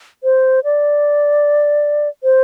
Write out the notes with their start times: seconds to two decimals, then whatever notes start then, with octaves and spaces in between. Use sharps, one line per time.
0.24 C5
0.64 D5
2.24 C5